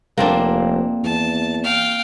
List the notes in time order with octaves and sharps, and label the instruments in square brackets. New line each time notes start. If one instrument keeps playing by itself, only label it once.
[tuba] F1 [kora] A#3 C4 D4
[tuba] E2 [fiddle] A5
[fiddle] F5 G5